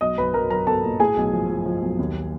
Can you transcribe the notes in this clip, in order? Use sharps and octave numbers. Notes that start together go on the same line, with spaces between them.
B1 D#5 D#6
B1 B4 B5
F#3 A#4 A#5
F#3 A#4 A#5
B3 A4 A5
A#2
A2 G#4 G#5
B1
F3
F3
F3
B1
D#2